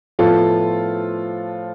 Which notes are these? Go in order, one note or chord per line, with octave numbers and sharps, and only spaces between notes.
A2 F3 B3 F4 A4